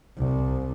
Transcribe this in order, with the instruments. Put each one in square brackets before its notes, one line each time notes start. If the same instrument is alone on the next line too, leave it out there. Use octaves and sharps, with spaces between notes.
[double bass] C2